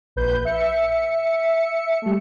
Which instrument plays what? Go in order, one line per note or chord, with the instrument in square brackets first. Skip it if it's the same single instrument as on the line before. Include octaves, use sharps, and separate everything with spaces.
[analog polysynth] A#1 B4 G6
E5 C#7
G3 A3